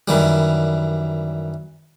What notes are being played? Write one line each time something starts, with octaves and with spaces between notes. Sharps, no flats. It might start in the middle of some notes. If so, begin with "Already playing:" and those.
F#2 D#3 E3 G3